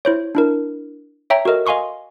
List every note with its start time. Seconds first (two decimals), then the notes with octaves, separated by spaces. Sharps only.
0.05 E4 C5 C#5
0.35 D4 E4 A#4
1.30 C#5 E5 G5 A#5
1.45 F#4 A4 A#4 D#5
1.66 D#5 F5 G#5 C6 C#6 D#6